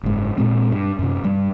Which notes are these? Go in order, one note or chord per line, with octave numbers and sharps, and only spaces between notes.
F#1 G#2
A#2 G#3 C4
G2
F#2 C3
G2 G3